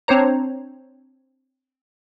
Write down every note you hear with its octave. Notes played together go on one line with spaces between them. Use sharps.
C4 D4 C5 C#5 A#5